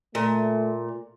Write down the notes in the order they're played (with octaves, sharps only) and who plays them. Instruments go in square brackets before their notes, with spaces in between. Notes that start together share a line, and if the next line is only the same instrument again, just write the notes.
[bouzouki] A#2 [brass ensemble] A3